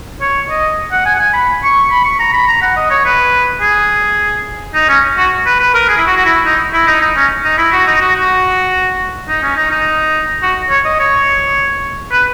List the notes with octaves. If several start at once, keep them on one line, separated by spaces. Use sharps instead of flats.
C#5
D#5
F#5
G#5
F#5
G#5
B5
C#6
B5
C#6
A#5
B5
A#5
F#5
D#5
C#5
B4
G#4
D#4
C#4
F#4
B4
B4
A#4
G#4
E4
F#4
F#4
E4
D#4
E4
D#4
D#4
C#4
D#4
E4
F#4
D#4
F#4
F#4
D#4
C#4
D#4
D#4
F#4
C#5
D#5
C#5
B4